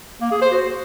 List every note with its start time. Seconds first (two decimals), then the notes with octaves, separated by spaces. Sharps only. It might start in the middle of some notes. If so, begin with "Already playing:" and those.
0.21 A#3
0.31 G#4
0.42 C5
0.52 F#4